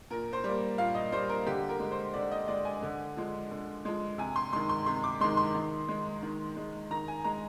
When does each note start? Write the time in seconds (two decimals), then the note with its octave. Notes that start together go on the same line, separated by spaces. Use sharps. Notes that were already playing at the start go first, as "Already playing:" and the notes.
0.10 A#2 A#4
0.33 C5
0.44 G3 A#3
0.78 A#2 F5
0.95 D#5
1.12 G3 A#3 C5
1.29 A#4
1.46 D3 G4
1.69 A#4
1.80 G#3
1.91 C5
2.14 D3 D5
2.31 D#5
2.48 G#3 D5
2.65 G#5
2.82 D3
3.17 F3 G#3
3.51 D3
3.85 F3 G#3
4.18 C3 G#5
4.36 C6
4.53 D#3 G#3 C6
4.69 C6
4.86 C3 C6
5.04 D6
5.20 D#3 G#3 C6
5.37 C6
5.54 D#3
5.88 G#3
6.22 D#3
6.57 G#3
6.91 D#3 A#5
7.08 G#5
7.24 G#3 A#5